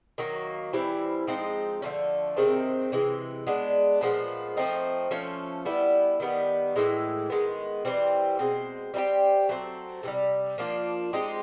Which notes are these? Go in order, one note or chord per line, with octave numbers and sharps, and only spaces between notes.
D#3 F#3 A#3
E3 G3 C4 E4
F3 G#3 C4 D#4
D3 F3 A3 C#4
C3 D#3 G#3 C4
C3 E3 G#3
G#3 B3 D4
A#2 F3 G#3 B3
F3 A3 C4 D#4
F3 A3 C#4
G3 B3 E4
D#3 G3 B3
A2 E3 G#3
D#3 G#3 B3
E3 G3 C4
B2 G#3 C4
G3 C4 D#4 G4
F#3 A3 C4
C3 E3 G3
F3 A#3 D4 F4
G#3 C4 D#4 G4